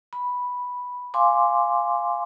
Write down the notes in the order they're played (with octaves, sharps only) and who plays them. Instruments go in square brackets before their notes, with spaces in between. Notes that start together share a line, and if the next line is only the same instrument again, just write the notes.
[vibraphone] B5
F5 G#5 C6 D6